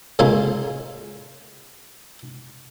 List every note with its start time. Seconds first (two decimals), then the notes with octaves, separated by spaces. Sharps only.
0.19 A2 C#3 G#3 A#3 F4